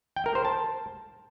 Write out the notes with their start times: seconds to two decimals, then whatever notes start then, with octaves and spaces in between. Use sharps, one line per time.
0.16 G5
0.26 A#4
0.35 C5
0.45 A5